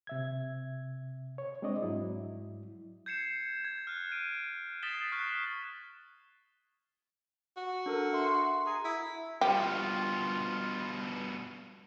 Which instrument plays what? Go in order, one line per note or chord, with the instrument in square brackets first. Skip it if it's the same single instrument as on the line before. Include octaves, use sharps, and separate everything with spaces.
[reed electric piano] C3 E5 G#6
C#5
G#3 C4 D4 D5 D#5
G#2 F#3 E4
[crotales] G6 G#6 C7 C#7 E7
G#6
F6 F#6
D7 D#7
D#6 A6 B6 C7 E7 G7
C#6 F6 F#6 B6 C7
[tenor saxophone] F#4
[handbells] D4 A4 A#4
E5 C6
[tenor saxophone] G#4 [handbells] A#5
[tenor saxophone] E4
[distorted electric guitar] G2 B2 [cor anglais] F4 [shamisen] G4